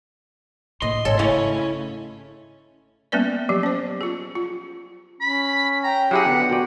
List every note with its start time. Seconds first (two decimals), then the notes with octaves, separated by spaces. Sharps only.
0.82 A2 A#3 D#5 C6
1.05 G#1 A4 C#5
1.19 C#3 A3 C#4 E4
3.12 G3 A#3 B3 C#4 B4 D5
3.49 F3 F#3 G4
3.63 C#4 C5
4.01 F4 G#4
4.35 F4
5.21 C#4 B5
5.84 G5 A#5
6.11 F#3 E4 G4 G#4 F#5
6.26 D3 B3
6.50 A#2 F#4 D5